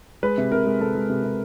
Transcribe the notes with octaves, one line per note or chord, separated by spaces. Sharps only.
G#3 B4
C3
C3 A#4
G#3
C3 A4
G#3
C3
C3